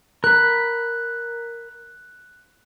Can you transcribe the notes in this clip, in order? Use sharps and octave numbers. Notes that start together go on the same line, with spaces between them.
A#4 B5 F#6